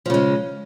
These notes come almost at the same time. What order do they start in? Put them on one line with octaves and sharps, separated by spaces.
F3 C#3 G#3